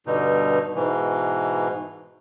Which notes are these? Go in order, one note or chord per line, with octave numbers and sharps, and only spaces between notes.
G2 B2 D3 D#4
G#2 B2 E3